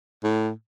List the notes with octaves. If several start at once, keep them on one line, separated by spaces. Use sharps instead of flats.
A2